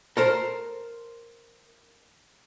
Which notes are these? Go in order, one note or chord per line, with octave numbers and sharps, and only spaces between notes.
A4 A#4 C5